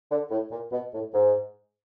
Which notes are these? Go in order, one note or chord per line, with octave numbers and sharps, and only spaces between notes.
D3
A2
A#2
B2
A2
G#2